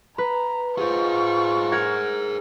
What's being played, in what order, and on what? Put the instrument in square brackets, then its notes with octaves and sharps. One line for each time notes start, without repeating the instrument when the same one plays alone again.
[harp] B4 [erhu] A#5
[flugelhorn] F4 [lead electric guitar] G#4 C5 [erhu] C#6
[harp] A#4 F#5 G#6